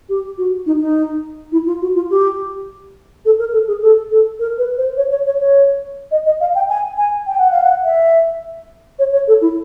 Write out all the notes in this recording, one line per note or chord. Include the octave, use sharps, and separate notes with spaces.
G4
F#4
D#4
D#4
E4
F4
F#4
F4
G4
A4
A#4
A4
G#4
A4
A4
A#4
B4
C5
C#5
C#5
C#5
C#5
D#5
D#5
F5
G5
G#5
G#5
G5
F#5
F5
F#5
E5
C#5
C#5
A4
E4